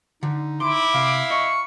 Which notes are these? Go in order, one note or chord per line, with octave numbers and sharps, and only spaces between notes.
D3 D#4
E4 C6 D6
C3 F5
D#5 C#6